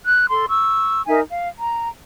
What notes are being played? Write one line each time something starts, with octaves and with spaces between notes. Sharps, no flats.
F#6
A4 C6
C#6 E6
D#4 A#4 E5 G#5
F5
A#5